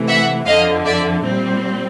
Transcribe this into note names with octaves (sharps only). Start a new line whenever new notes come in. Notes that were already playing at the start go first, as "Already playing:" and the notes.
Already playing: C3 E3 A3
E5 F#5
F2 D3 F3 D#5 F5
D5 E5
A#2 G3 C4